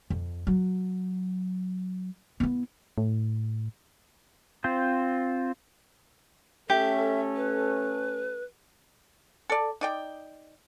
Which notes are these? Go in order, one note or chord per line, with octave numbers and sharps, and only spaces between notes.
F2
F#3
B3 E4
A2
C4 F4 C5
A3 C#4 G4 A4 E5
B4
A4 D5
D#4 D5 G5